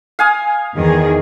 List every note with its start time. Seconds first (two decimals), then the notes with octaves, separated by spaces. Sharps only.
0.19 F5 G#5 D#6
0.77 E2 D#3 G#4